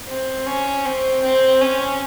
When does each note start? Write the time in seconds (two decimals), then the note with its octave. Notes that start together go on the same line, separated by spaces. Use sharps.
0.08 C4
0.47 C#4
0.86 C4
1.24 C4
1.61 C#4